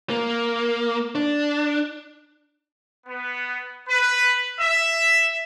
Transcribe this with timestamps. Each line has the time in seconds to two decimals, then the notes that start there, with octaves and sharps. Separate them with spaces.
0.10 A#3
1.15 D4
3.07 B3
3.88 B4
4.59 E5